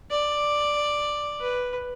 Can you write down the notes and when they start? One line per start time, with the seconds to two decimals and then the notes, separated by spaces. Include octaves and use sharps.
0.11 D5
1.40 B4